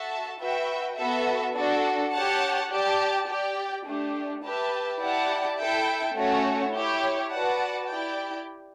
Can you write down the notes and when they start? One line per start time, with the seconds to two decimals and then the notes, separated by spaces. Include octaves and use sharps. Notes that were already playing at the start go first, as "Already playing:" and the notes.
Already playing: F#4 A4 E5 A5
0.39 F#4 B4 E5 G5
0.96 B3 F#4 A4 E5
1.54 D4 F#4 A4
2.12 G4 C#5 F#5 A5
2.70 G4 D5 A5
3.27 G4 D5 G5
3.85 A3 D4 G4
4.42 G4 B4 E5 A5
5.00 E4 G4 D5 F#5 A5
5.57 E4 A4 E5 G5
6.15 A3 C#4 F#4 C#5
6.72 E4 G4 C#5
7.30 F#4 B4 D5 F#5 A5
7.87 E4 G4 D5 G5